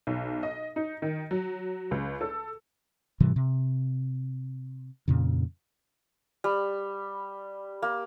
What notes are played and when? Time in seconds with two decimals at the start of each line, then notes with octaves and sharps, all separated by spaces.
0.07 B1
0.43 D#5
0.76 D#4
1.02 D#3
1.31 F#3
1.91 C#2
2.21 A4
3.20 G#2 C3 E3 G3
3.36 C3
5.08 F2 A#2 C#3
6.44 G3
7.82 A#3